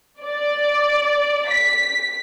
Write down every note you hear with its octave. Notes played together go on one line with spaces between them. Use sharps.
D5
B6